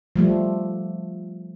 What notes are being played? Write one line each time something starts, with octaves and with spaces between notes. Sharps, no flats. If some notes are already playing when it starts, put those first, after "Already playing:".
F3 G3 A3